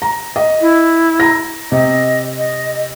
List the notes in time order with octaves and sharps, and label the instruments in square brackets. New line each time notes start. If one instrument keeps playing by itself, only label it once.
[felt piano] A#5
D#5
[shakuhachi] E4
[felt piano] A#5 A#6
[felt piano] C3 [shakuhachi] D#5
[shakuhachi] D#5